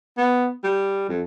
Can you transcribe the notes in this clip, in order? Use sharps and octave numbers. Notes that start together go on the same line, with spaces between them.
B3
G3
F2